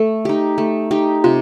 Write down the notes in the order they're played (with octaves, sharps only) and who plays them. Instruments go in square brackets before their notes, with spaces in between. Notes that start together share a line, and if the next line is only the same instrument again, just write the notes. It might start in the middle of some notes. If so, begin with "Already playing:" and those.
Already playing: [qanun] A3 [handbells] A4
[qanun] D#4 G4
A3
D#4 G4
[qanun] C3 [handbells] F4